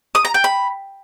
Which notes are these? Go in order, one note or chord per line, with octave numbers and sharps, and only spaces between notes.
D#6
A#5
G5
B5